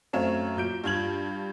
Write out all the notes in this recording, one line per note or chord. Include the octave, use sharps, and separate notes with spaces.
F#2 A3 C4 C#5 F5 E7
A#2 F#3 G6 D7
G2 F4 G#6 F#7